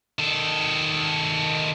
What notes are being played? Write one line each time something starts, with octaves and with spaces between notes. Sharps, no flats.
D#3 A4